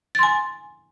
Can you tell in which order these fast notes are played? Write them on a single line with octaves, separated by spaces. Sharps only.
A6 C6 G#5